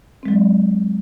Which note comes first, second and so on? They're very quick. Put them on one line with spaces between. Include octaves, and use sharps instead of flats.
C4 G#3 F#3